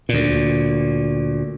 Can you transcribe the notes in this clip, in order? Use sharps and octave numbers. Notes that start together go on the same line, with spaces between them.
D2 A#2